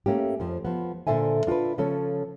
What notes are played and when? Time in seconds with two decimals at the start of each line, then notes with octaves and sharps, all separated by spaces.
0.06 A3 A#3 C#4 G4
0.40 F2 F3
0.65 F3 B3
1.07 A#2 D3 A4 C5 E5 G#5
1.47 D4 F4 F#4 A4 B4
1.78 C#3 F3 C#4 A4 C#5